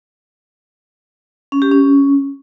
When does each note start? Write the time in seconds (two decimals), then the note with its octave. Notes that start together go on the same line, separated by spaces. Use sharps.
1.52 C#4
1.62 G4
1.71 C#4